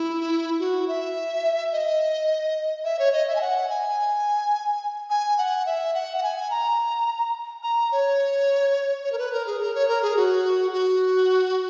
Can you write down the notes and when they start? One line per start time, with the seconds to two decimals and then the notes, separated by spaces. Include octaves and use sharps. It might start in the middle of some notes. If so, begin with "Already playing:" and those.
Already playing: E4
0.60 F#4
0.88 E5
1.72 D#5
2.84 E5
2.99 C#5
3.13 D#5
3.27 E5
3.36 G#5
3.41 F#5
3.69 G#5
5.10 G#5
5.38 F#5
5.66 E5
5.94 F#5
6.17 F#5
6.23 G#5
6.51 A#5
7.63 A#5
7.92 C#5
9.04 C#5
9.12 A#4
9.19 B4
9.33 A#4
9.47 G#4
9.61 A#4
9.75 C#5
9.88 A#4
10.02 G#4
10.16 F#4
10.73 F#4